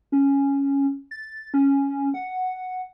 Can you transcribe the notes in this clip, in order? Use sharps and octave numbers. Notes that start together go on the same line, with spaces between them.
C#4
A6
C#4
F#5